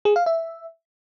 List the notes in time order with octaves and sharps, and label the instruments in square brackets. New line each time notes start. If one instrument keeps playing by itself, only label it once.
[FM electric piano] G#4
F5
E5